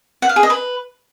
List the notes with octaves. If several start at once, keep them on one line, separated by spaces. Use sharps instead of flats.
F#5
F5
G#4
D#5
B4